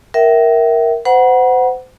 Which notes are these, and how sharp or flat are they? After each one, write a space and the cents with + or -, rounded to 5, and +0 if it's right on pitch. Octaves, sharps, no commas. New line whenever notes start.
A#4 +5 E5 -5 G5 -40
C5 -35 F#5 +5 B5 -45